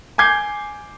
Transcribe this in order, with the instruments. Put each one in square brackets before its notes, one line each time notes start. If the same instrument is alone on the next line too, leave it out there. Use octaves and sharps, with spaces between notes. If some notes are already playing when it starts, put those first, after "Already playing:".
[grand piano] G#5 D6 G6 G#6 C7